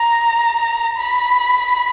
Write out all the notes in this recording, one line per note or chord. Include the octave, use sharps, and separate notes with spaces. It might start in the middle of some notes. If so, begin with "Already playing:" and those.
Already playing: A#5
B5